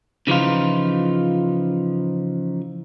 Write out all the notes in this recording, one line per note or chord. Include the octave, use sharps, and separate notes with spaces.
C#3 E3 F3 D#4 F4